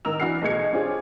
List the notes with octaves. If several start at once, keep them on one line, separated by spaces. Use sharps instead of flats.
A1 D#3 A#4 D#5 E6 F7
E3 D4 E4 F#4 F6 C7
B1 B2 A3 G#4 G#6 C#7
C4 D4 F4 G4 G#4 C#5